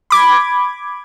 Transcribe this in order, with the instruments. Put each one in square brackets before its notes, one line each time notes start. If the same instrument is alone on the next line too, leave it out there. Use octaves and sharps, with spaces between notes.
[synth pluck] B5 D6 G#6